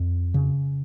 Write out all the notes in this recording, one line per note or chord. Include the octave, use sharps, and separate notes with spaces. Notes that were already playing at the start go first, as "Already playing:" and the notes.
Already playing: F2
C#3